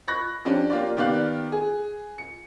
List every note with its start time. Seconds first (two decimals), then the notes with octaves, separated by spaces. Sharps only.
0.08 B5 C#6 F#6 A#6
0.45 F3 C#4 D4 G4
0.70 A#3 F4 G4 D5
0.97 D#3 B3 G4 D5 F5 F#6
1.52 G#4
2.18 C#7